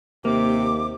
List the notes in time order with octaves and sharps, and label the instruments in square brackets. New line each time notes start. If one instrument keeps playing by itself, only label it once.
[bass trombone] D#2 [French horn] C3 [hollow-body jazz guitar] A#3 [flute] D6